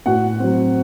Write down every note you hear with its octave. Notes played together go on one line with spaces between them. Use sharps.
A2 F#4 F#5
F#3 C4